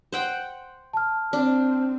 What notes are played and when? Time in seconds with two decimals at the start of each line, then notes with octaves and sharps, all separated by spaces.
0.12 C5 F#5 G5
0.93 A5 F6
1.33 C4 D4